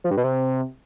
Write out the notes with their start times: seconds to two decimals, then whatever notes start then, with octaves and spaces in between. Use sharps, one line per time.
0.04 F3
0.11 G2
0.17 B2
0.24 C3